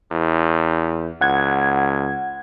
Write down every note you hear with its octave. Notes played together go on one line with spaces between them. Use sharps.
E2
C#2 F#5 G#6